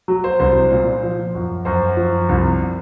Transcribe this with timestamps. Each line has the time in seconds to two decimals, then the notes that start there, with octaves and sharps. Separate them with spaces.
0.08 F#3
0.24 C5
0.40 C2 C5
0.71 A#2
1.03 F3
1.35 F#2
1.65 F#2 C5
1.97 F3
2.29 C2